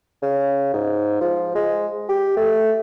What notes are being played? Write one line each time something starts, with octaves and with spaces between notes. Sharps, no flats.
C#3
G#2
F3
G#3
G4
A3